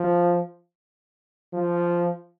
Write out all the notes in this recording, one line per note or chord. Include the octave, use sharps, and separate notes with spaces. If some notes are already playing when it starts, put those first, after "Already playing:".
Already playing: F3
F3